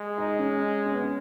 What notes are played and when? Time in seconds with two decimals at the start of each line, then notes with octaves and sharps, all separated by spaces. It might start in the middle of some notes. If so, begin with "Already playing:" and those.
Already playing: G#3
0.18 D#4
0.39 C#4
0.86 C#4
0.94 B3
1.03 C#4